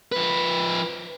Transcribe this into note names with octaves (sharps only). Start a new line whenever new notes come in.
F3 B4